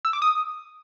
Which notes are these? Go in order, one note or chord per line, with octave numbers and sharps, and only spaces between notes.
E6
D6
D#6